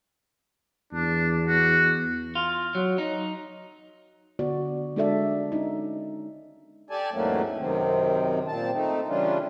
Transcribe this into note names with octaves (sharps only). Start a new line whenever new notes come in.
E2 D4
F#4
F4
F#3
D#4
D3 B3 F#4 D5
G#3 D4 F#4 A4 D5 E5
C#4 D#4
G4 A4 D5 G#5 A5
E2 G#2 F#3 A3 A#3 C#4
F#2 C3 D#3 C4
A#2 C4 A5
A3 C4 D#4
C#3 E3 G3 C#4 D4 F4